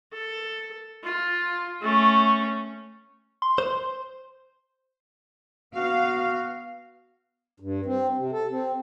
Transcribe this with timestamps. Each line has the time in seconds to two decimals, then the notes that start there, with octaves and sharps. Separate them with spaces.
0.13 A4
1.04 F4
1.82 A3 C#4
3.42 C6
3.58 C5
5.75 B3 F#4 F5
7.60 G2
7.86 C4
8.17 C3
8.32 A4
8.50 C4